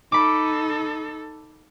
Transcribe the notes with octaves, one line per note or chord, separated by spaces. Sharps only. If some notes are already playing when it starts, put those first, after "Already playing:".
D#4 A4 B5 D6